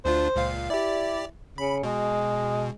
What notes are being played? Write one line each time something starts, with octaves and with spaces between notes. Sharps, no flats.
D2 D4 F4 C5
C#2 A#2 F5
E4 G4 D5
C#3 B5
B2 G#3